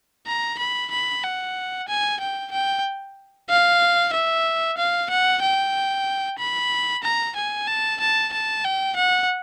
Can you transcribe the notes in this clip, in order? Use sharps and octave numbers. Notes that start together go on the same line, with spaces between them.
A#5
B5
B5
F#5
G#5
G5
G5
F5
E5
F5
F#5
G5
B5
A#5
G#5
A5
A5
A5
G5
F#5